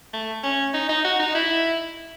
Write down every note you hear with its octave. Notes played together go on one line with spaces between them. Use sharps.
A3
C#4
D#4
D#4
F#4
D#4
E4